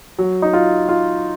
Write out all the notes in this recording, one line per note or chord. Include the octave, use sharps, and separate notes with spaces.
F#3
D#4
F4
F4